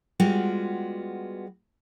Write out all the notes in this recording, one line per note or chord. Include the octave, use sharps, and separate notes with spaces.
G3 G#3 B3 F4 F#4